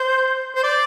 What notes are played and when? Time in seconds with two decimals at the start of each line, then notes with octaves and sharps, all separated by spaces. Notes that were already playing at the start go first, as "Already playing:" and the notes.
Already playing: C5
0.55 C5
0.63 D5